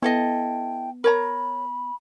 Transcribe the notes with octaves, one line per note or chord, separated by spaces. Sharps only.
B3 E4 A4 D#5 G5
A#4 C#5 A#5 B5